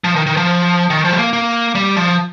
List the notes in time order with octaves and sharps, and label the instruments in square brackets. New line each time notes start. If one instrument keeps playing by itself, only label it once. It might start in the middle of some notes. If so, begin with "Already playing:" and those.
[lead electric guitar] F3
D#3
D#3
F3
D#3
F3
G3
A#3
A#3
G3
F3